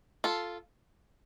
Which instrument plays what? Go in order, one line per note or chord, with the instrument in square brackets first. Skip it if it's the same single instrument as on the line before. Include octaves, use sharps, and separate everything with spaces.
[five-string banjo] F4 A4